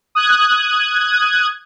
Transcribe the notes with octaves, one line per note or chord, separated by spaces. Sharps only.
D#6 F#6 G#6